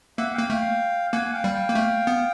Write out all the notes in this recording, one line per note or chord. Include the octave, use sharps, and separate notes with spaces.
A#3 E5 F#5
A#3 F5 G5
A3 F5 G5
A#3 F#5 G#5
F5 G5
G3
F5 G5
A#3
A3
B3